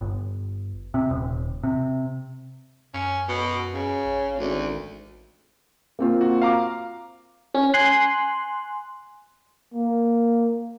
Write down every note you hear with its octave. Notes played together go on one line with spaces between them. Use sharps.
G1
C3
D#1
C3
F#2 C#4
B2
C#3 C#4
A1
G#1 D2
A#3 C4 F4
F#4
F5 A#5 D6
C#4
G#5 C6 F#6
A#3